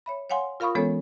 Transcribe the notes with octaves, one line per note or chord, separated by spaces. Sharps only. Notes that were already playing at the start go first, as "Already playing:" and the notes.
C#5 E5 B5
C#5 F5 F#5 G#5 C6
F4 A#4 F5 B5 C#6 D#6
E3 G#3 B3 C#4 A4 C#5